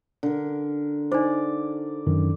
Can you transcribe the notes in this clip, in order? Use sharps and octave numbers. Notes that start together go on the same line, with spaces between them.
D3 A#4
D#4 C5 D5
F#2 D#3